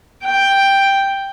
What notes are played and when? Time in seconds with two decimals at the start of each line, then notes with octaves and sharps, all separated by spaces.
0.24 G5